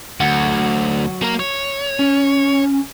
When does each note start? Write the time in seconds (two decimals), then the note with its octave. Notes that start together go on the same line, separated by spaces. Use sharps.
0.20 D2 F#3 F#5
1.22 A#3 A#4
1.39 C#5
1.99 C#4